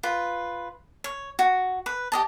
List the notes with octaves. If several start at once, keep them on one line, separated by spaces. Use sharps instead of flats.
F4 B4
C#5
F#4
B4
G4 D#5 A5